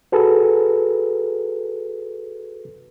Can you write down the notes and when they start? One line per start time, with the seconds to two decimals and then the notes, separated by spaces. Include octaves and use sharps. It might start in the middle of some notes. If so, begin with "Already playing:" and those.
0.12 F#4 G#4 A4 B4